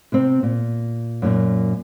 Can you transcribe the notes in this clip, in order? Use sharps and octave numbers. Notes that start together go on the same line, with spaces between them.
C3 C4
A#2
F#2 A#2